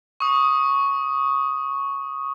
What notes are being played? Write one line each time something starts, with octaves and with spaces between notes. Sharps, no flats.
C#6 D#6